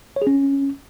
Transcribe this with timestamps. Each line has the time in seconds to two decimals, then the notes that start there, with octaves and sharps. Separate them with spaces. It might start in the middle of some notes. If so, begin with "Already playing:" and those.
0.16 C#5
0.22 G#4
0.27 C#4